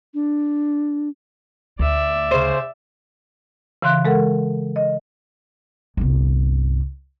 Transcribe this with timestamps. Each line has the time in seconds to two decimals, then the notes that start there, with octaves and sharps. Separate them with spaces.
0.14 D4
1.79 D2 D5 E5
2.31 C#3 C5
3.82 C#3 E3 F5 C6 F#6
4.05 G#3 A4 A#4 F#5
4.76 D#5
5.97 G1 C2